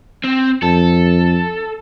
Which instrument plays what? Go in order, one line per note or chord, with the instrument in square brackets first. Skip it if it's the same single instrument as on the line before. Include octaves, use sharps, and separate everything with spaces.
[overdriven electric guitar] C4
[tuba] F2 [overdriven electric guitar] A4